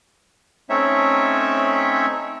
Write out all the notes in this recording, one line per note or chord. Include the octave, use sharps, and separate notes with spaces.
A3 C4 C#4 D#4 C#5 E5